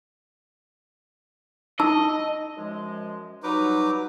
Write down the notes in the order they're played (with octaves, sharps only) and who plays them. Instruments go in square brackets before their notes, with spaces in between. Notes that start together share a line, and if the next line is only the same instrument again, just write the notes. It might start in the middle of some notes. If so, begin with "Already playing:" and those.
[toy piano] D#4 A5 E6 [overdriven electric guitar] D#5
[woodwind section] F#2 F3 G#3
[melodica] F#3 B4 D6 [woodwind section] G3 D#4